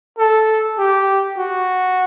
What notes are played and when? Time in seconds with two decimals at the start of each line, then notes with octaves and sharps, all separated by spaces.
0.18 A4
0.78 G4
1.38 F#4